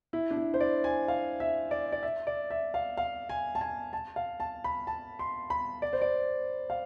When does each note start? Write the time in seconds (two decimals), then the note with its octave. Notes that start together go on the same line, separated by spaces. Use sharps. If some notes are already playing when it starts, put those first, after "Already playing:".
0.13 E4
0.31 D4
0.37 E4
0.54 C5
0.60 D5
0.84 G#5
1.08 F5
1.40 E5
1.71 D5
1.92 D5
2.03 E5
2.27 D5
2.50 E5
2.74 F5
2.97 F5
3.29 G#5
3.55 A5
3.61 G#5
3.93 A5
4.16 F5
4.40 A5
4.64 B5
4.87 A5
5.19 C6
5.50 B5
5.82 D5
5.93 C5
6.02 D5
6.70 F5